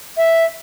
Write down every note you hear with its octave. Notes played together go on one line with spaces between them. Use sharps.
E5